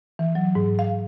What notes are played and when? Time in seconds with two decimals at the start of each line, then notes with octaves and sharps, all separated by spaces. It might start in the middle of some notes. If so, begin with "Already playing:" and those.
0.19 E3
0.35 F#3
0.55 G#2
0.79 F5